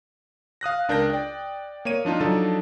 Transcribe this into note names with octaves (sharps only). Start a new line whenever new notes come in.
F5 D#6 F#6 A#6
C#2 D4 A#4 G6 A#6
D5 G5
A#3 C#5 D#7
F3 D4 D#4 F4
F3 F#3 D4 D#4 A4 D5